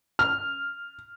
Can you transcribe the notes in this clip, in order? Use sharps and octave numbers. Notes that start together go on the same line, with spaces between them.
F6